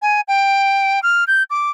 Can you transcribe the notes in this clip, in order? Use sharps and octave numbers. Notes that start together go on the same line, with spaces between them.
G#5
G5
F6
G6
D6